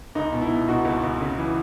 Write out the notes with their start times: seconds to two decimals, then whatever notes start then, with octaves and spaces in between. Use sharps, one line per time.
0.15 C#2 D#4
0.32 B2
0.42 E4
0.50 B2
0.68 B2 D#4 F#4
0.85 C#2
1.03 C#2
1.21 C#3
1.38 E3